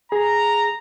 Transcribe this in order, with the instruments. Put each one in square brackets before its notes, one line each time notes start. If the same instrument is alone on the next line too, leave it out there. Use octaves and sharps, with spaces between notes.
[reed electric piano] G#4 [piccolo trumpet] A#5